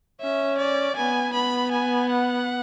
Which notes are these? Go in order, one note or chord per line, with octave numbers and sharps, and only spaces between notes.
C#4 E5
D5
B3 G#5
B3 B5
G#5
F#5